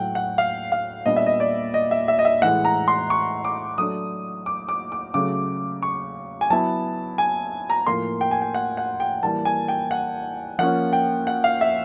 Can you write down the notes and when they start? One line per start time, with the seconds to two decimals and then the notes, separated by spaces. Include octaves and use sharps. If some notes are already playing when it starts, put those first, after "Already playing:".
Already playing: A2 F#3 A3 F#5 G5
0.15 F#5
0.38 F5
0.72 F5
1.06 A#2 G3 B3 D4 D#5
1.16 E5
1.27 D#5
1.40 D5
1.74 D#5
1.91 E5
2.08 E5
2.19 D#5
2.25 E5
2.42 A2 E3 G#3 F#5
2.65 A#5
2.88 C6
3.10 C#6
3.45 D6
3.78 F#3 A3 D4 D#6
4.46 D6
4.69 D6
4.92 D6
5.14 C#3 F#3 A3 D6
5.82 C#6
6.41 G#5
6.50 F#3 B3 E4 A5
7.18 G#5
7.70 A#5
7.87 A2 F3 A#3 C6
8.21 G5
8.31 G#5
8.42 G5
8.54 F#5
8.77 F#5
9.00 G5
9.23 E3 G3 A#3 A5
9.45 G#5
9.68 G5
9.91 F#5
10.59 F3 A#3 C#4 F#5
10.93 G5
11.27 F#5
11.44 F5
11.61 E5